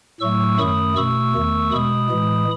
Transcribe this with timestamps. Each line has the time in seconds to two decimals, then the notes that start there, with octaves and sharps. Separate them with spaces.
0.20 A2 F#3 A3 C#6 E6
0.58 F#2 D#3 A3 B5 D#6
0.96 B2 A3 C#6 E6
1.33 E2 D#3 A3
1.71 B2 G#3 B5 D#6
2.09 A2 E3 G#3